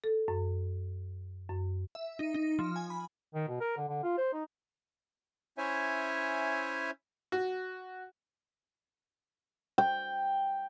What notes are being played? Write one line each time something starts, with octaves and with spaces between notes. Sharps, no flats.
A4
F#2
F#2
E5
D#4
D#4
F3
G#5
B5
D#3
B2
A#4
D3
D3
F4
C5
D#4
C#4 E4 C5 C#5 E5 G#5
F#4
G5